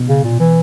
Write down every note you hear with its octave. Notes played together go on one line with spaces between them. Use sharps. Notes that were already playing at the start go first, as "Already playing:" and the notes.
Already playing: B2
C#3
A#2
E3